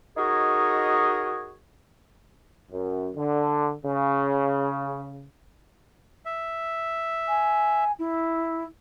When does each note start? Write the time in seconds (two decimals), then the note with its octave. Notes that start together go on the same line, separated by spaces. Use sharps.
0.17 D#4 F#4 G#4 A#4 C#5 D#5
2.72 F#2
3.17 D3
3.84 C#3
6.26 E5
7.28 G#5
7.99 E4